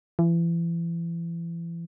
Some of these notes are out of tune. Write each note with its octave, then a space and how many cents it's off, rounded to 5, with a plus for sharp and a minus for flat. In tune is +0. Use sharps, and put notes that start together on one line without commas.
E3 +35